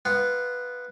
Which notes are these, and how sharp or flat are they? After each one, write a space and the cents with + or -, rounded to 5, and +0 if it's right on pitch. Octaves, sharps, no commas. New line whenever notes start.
B3 +0 F4 -15 F#5 +0